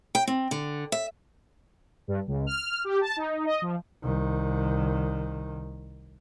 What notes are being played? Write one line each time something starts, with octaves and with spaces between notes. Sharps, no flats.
G5
C4
D3
E5
G2
C#2
F6
G4
A5
D#4
D#5
F3
C2 D#3